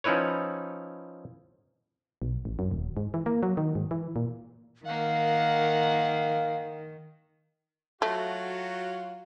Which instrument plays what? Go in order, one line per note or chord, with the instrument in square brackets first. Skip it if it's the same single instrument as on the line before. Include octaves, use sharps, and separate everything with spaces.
[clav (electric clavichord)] F3 C#4 D#4 E4 B4 C#5
[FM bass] B1
A1
F#2
D#1
G#2
E3
A#3
F#3
D#3
G#2
E3
A#2
[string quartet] D#3 [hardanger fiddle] A#3 F#5 [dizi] F5
[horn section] F#3 F4 F#4 [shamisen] A3